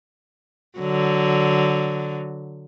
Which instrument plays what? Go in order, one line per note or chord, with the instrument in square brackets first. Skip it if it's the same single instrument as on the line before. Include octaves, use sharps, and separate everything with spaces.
[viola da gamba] D3 F#3